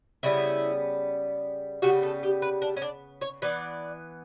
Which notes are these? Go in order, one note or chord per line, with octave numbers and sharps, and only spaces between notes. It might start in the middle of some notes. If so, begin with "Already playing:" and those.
C#3 G3 B3 E4
C#3 G3 B3 F#4
A4
G4
B4
D4
C#4
D4
C#5
E3 B3 D5